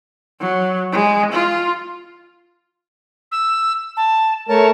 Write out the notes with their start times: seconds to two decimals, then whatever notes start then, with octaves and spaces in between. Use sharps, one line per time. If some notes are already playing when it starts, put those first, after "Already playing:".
0.41 F#3
0.92 G#3
1.32 F4
3.32 E6
3.97 A5
4.49 A3 A#4 C#5 A5